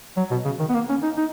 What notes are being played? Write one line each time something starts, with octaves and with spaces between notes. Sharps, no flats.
F#3
B2
C#3
D#3
B3
A#3
C#4
D#4
D#4